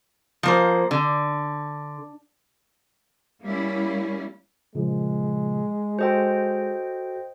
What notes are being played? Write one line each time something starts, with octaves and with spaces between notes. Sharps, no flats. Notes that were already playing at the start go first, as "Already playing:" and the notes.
F3 A#3 C5
D3
G3 A#3 C#4 E4
A#2 C#3 F3 G#3
F#4 A4 C5 D#5 G5